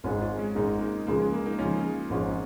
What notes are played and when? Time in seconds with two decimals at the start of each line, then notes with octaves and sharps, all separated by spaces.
0.04 G#1 G#2 G#3 C#4 F4
0.22 C#4 F4
0.38 G#3 C#4
0.55 G#1 G#2 G#3 A#3 D#4
0.81 A#3 D#4
1.07 C#2 C#3 F3 A#3
1.20 G#3
1.33 A#3
1.46 A#3 D#4
1.59 C#2 C#3 F3 C#4 F4
2.10 G#1 G#2 F3 C#4